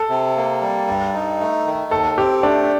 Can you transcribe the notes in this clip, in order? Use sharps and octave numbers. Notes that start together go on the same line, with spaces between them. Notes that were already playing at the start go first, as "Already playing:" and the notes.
Already playing: A4
C3
A#3
G3
G2
D#4
A3
D#3
D#2 A4
C4 G4
A3 D4